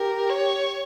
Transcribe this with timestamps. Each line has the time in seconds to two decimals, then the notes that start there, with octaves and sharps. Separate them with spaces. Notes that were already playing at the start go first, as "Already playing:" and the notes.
Already playing: G4 A#4
0.29 C#5